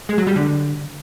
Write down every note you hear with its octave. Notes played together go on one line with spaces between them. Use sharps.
G#3
F#3
G3
D3